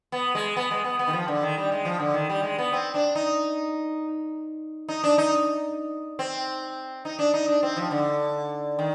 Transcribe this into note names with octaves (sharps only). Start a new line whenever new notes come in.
B3
G#3
B3
G#3
B3
B3
D#3
F3
D3
D#3
G3
G#3
F3
D3
D#3
G3
G#3
B3
C4
D4
D#4
D#4
D4
D#4
C4
D#4
D4
D#4
D4
C4
F3
D3
D#3